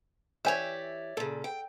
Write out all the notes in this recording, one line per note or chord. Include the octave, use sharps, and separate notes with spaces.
E3 G4 C#5 D5 E5 G#5
A#2 C#3 A4
G5